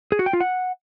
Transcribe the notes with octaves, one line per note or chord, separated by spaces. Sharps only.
G#4
F#4
G5
F4
F#5